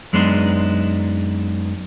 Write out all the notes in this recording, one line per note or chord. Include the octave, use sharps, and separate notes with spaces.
F#2 G#3 B3 D4 D#4 C6